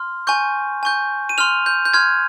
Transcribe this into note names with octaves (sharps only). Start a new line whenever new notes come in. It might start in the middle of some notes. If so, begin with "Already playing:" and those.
Already playing: C6 F6
G#5 C#6 G6
G#5 C#6 G6
D#7
C6 F6 F7
G6
G6
C6 F6 G#6